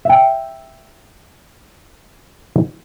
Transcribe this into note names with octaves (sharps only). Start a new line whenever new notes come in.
E5 G5